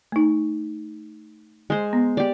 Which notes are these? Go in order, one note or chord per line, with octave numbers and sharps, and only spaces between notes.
A3 D#4
G#3 C5
B3
G4 D5